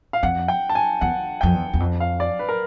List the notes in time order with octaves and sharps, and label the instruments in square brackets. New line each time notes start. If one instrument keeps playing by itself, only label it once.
[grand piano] F5
[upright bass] F2 [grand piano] F#5
[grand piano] G5
A5
G#5
[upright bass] E2 [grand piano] F#5
[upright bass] F2 [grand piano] G5
[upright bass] E2
E2
F2
[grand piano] F5
D5
B4
A#4